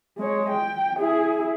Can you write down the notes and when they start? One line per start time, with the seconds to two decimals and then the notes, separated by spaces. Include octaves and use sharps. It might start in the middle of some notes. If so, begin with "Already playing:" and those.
0.18 G#3 C#5
0.50 G5
0.99 E4 G#4